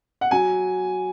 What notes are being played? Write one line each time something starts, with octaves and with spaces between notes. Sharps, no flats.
F#5
F#3 G#5